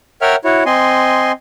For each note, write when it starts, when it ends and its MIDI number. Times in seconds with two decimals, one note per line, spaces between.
0.22 0.36 70
0.22 0.36 73
0.22 0.36 76
0.22 0.36 78
0.22 0.36 79
0.22 0.36 89
0.44 0.64 64
0.44 0.64 66
0.44 0.64 73
0.66 1.32 60
0.66 1.32 75
0.66 1.32 80
0.66 1.32 84